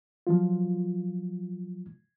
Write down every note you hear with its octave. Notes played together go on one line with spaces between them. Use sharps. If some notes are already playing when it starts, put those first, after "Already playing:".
F3 F#3 F4